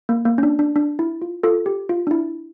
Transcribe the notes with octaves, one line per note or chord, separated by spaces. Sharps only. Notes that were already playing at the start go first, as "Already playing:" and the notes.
A#3
A#3
C#4
D4
D4
D4
E4
F4
F4 A4
G4
F4
D4
E4